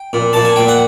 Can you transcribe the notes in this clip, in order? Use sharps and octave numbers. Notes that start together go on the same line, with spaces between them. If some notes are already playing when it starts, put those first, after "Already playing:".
Already playing: G5
A#2
A#2 A5
G#5
A#2 G5
F#5